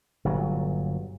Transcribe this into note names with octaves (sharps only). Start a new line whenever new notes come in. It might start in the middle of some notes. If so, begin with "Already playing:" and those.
G1 A#2 F#3